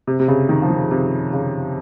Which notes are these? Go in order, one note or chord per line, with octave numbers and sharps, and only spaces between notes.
C3
C3
C#3
D#3
F3
D#3
C3
C#3